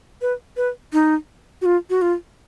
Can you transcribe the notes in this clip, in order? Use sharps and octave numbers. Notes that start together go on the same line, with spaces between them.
B4
B4
D#4
F#4
F4
F#4
F4